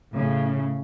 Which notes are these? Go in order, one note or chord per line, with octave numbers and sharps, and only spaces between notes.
A2 C#3